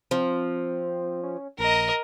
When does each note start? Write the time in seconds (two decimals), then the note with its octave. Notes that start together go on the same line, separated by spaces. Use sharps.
0.11 F3 C4
1.23 C#4
1.59 A#1 A#4 D#5